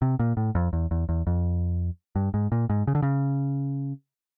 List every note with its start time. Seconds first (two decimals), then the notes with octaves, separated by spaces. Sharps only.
0.02 C3
0.19 A#2
0.37 A2
0.55 F2
0.73 E2
0.91 E2
1.09 E2
1.27 F2
2.16 G2
2.34 G#2
2.52 A#2
2.70 G#2
2.87 C#3
2.95 D3
3.02 C#3